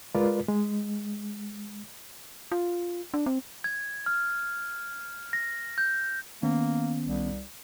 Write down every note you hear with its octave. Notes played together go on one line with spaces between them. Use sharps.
G#3 F4 A#4 B4 D5
G#3
F4
D4
C4
G#6
F6
A#6
G6
D#3 A#3 B3 C#4
C2